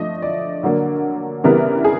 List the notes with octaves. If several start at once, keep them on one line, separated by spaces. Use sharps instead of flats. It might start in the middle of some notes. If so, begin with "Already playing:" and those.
Already playing: F3 A3 D4 D#5
D5
D3 F#3 A#3
C#3 E3 G3 B3 A#4
G#4